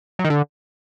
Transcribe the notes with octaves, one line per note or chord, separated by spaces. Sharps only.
F#3
D#3
D3